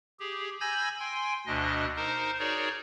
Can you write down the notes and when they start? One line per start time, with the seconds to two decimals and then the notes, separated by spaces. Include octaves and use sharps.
0.20 G4 G#4
0.60 G#5 B5 E6 G6 G#6 A#6
1.00 G5 G#5 C6
1.47 D2 B2 D4 D#5
1.96 D#4 A#4 C5
2.39 D#4 F#4 G#4 A#4 C#5 D5